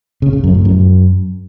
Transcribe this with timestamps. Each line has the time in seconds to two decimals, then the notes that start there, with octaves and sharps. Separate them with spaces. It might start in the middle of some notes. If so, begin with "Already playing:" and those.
0.22 C#3
0.33 C#3
0.44 F#2
0.54 A2
0.65 F#2